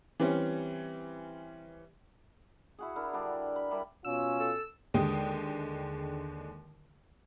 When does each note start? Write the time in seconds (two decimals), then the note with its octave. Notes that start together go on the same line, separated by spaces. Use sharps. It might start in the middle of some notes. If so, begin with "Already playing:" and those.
0.20 E3 G3 C4 C#4
2.79 E4 F#4 G#4
2.96 D4 E4 A#4
3.13 D3 G3 D4
3.56 B5
3.71 G3 D4 E4 A#4
4.05 B2 C#4 F4 E6
4.40 A4
4.94 D#2 D3 G#3 G4 G5 D#6